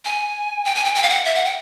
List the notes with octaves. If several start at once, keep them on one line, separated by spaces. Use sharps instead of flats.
G#5
G5
G#5
G5
G5
F5
F#5
E5
F#5
G5